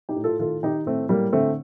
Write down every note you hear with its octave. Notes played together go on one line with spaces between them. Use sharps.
D#4 G4
A2
F4 A4
D#3 F4 A4
D#3 D#4 G4
A2 A3 C4
A2 G3 A#3
D3 A3 C4